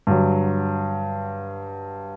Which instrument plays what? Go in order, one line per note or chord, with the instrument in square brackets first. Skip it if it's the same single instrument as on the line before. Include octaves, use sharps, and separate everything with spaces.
[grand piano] G2 D3 F#3